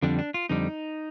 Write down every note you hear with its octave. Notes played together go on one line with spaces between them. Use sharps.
F2 D3 G3 D4
D4
F4
F2 D3 G3 D#4